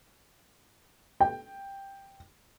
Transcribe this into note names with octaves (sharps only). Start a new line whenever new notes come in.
G5